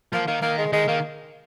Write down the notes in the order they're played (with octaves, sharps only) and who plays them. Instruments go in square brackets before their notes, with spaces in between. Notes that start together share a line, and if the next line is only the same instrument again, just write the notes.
[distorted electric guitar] F3 [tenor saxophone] A#3
[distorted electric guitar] D#3 [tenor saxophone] A#3
[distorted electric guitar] D#3 [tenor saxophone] A#3
[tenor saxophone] G#3
[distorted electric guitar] D#3 [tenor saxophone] G#3
[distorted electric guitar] D#3 [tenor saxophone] A#3